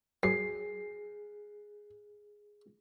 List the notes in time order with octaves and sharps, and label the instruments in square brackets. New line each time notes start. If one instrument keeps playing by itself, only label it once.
[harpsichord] F#2 [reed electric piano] G#4 [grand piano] C7